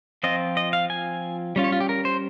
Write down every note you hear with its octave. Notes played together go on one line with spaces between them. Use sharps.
F3 C4 F4 D#5
D#5
F5
G#5
G3 C#4 F4
C#5
F4
G4
A#4
C5